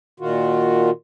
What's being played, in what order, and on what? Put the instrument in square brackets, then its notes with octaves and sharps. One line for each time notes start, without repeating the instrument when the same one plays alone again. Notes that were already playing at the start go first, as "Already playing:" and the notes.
[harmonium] A#2 D#3 F4 F#4